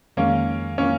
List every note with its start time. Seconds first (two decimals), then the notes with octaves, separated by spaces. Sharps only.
0.17 F2 D#3 G#3 A#3 C#4
0.78 A#3 C#4